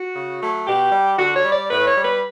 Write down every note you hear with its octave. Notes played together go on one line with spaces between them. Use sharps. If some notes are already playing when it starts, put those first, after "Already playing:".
Already playing: F#4
C#3
F#3 A3
B2 G4
G3
D3 F#4
C#5
G3
D5
A2 B4
C#5
G3
B4